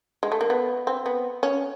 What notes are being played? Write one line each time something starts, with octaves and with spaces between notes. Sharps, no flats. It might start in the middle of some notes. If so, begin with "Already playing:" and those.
G#3
A3
A#3
B3
C4
B3
C#4